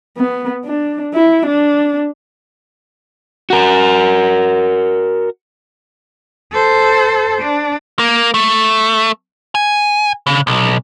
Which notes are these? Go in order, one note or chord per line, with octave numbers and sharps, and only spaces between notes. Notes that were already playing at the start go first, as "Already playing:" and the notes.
B3
D4
E4
D4
F#4 A#4
A4 C5
D4
A#3
A3
G#5
C#3
B1